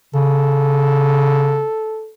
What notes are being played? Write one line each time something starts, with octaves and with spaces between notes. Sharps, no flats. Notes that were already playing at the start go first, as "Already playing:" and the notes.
C#3 A4